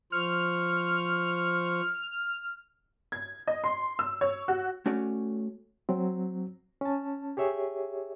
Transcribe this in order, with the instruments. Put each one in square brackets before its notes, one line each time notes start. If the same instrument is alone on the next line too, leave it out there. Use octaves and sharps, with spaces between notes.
[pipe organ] F3 C5 C#6 [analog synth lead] F6
[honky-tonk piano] G#6
D#5
C6
E6
C#5
F#4
[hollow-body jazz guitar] A3 C#4 F#4 C#5 D5
[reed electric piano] F#3 C4
C#4 A5
G4 G#4 C#5 E5